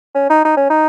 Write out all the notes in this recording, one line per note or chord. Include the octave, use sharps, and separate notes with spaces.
C#4
D#4
D#4
C#4
D#4